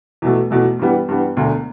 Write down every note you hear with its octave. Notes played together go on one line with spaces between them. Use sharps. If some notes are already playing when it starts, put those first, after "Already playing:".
E2 B2 A3
E2 B2 A3
G2 E3 G3 B3
G2 E3 G3 B3
E1 D2 D3